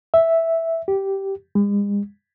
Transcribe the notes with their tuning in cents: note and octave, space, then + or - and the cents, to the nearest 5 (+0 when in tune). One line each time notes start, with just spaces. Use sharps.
E5 -5
G4 -10
G#3 -45